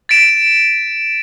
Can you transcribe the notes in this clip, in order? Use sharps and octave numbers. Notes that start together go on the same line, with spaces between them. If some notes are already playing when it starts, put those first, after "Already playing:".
A6 B6 D7 E7